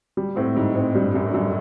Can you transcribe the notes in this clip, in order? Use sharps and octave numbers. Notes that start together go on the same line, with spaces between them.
G3
A2 C4
G#2 G3
G#2 C4
G2 G3
F#2 G3
G2
F#2 G3